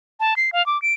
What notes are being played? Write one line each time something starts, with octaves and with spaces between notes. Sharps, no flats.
A5
C7
F5
D6
D7